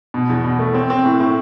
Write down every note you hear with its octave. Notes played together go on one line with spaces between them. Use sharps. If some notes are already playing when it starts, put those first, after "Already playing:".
B2
E2
B2
A3
C4
C4
A2
A2